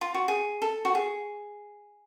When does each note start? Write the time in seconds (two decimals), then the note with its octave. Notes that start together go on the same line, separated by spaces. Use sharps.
0.01 F4
0.14 F#4
0.28 G#4
0.62 A4
0.85 F#4
0.95 G#4